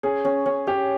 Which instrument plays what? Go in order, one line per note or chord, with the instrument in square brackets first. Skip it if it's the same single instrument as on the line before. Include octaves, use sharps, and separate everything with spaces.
[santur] C#4 [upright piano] G#4
[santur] C#4
C#4
[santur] C#4 [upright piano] G4